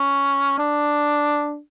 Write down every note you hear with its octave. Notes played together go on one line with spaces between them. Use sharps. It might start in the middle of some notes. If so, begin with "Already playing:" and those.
Already playing: C#4
D4